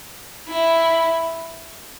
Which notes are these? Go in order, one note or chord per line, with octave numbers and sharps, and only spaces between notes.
E4